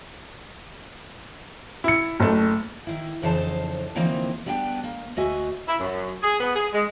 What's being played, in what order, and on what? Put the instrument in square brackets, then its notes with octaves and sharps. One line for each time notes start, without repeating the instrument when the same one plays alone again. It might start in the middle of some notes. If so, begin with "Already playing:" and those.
[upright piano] E4 C#7
F#1 A3
[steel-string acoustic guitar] D#3 E4
F2 C#3 E3 D#4 C5 A5
D3 E3 F3 A#3 C4 D#4
G3 B3 D4 D#5 G5
A#3
D2 F#4 D#5 E5 G#5
[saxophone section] E4
F#2
G#4
B3
G#4
G#3